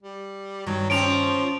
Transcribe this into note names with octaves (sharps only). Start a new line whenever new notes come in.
G3
G2 D#3 F#3
F3 C4 C#4 D7 F7